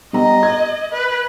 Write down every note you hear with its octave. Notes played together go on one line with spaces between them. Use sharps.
G3 B3 D#5 A#5
G#6
B4